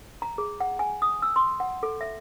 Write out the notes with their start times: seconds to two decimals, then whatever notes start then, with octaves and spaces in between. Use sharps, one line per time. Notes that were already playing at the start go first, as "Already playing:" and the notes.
0.22 A#5
0.38 G#4
0.60 F#5
0.79 G#5
1.02 D#6
1.22 E6
1.36 C6
1.60 F#5
1.83 A4
2.01 E5